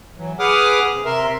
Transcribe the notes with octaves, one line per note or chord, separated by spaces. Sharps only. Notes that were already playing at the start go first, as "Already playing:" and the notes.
E3 F#3
G#4 B4 F#5 D6 D#6 F6
C3
C3 A#4 E5 C6